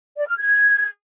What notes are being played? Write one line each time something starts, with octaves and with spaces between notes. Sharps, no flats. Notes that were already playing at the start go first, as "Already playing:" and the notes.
D5
F6
G#6